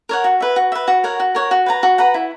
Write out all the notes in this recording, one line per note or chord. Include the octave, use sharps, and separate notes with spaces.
A#4 C#5 F#5
F#4
B4 E5
F#4
B4 E5
F#4
A#4 C#5 F#5
F#4
A#4 C#5 F#5
F#4
B4 F#5 A#5
F#4
B4 F#5 A#5
E4